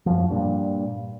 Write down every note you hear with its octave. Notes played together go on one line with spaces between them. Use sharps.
F#2 F3
G2 A#2